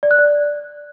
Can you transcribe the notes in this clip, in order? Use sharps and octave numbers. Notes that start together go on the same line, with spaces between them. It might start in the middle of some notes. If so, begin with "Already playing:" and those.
D5
F#6
D5